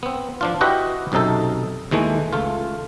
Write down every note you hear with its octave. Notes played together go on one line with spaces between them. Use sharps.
B3 C4
F3 D4 F4
E4 F#4 G4 B4 D#5 F#5
B1 F#2 C3 D#4 A4
D#2 E3 G#3 A3
C#2 A3 F4